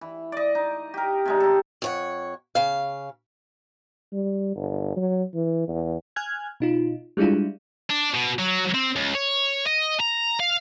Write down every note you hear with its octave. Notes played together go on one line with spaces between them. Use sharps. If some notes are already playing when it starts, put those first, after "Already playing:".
E3
D5 D#5
D#4
G4 A#4
C3 G#3 D#4
D#4 A4
F2 C#5 F#5
C#3 F5
G3
G1
F#3
E3
E2
G#5 F6 F#6 G#6
B2 D#4 F4
G3 G#3 D4 E4 F4
D4
B2
F#3
C4
C#2
C#5
D#5
A#5
F5